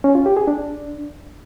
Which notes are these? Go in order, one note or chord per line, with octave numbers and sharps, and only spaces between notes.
C#4
F4
G4
G#4
D4